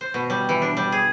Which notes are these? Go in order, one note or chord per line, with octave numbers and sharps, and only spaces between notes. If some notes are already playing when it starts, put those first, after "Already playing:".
C5
B2
G3
E3
D4
G3
G#4